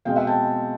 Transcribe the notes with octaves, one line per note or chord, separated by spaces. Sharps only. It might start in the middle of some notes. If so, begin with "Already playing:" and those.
B2 G#3 C4 F5 G5
E5 F#5
G5 A5